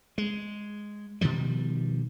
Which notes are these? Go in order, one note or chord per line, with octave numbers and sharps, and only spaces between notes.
G#3
B2 D#3 F3 G3